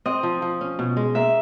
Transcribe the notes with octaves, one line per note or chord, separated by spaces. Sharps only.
C4 D#5
F3
F3
C#4
B2
G#3
A#3 E5